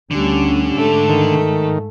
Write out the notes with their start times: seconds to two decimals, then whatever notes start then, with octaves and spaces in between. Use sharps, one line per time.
0.11 D2 D3 G3 C#4
0.76 G#2 A3
1.09 D#3